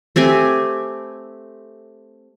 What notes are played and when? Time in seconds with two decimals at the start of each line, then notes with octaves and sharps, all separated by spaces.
0.16 A3 C4 G4 G#5